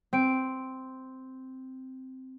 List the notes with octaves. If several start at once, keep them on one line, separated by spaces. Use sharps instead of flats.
C4 D7